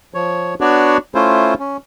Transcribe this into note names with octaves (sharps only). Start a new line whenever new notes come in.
F3 C#5
B3 D4 F#4 C#5 D5
A3 C#4 E4 F4 C5
C#4